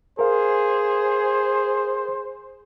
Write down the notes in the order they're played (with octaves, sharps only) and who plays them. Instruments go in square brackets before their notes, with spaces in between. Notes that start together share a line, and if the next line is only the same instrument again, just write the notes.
[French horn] G#4 [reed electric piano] A#4 F5 [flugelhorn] C5